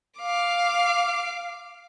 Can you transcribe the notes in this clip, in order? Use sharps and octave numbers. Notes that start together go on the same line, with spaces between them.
F5 D6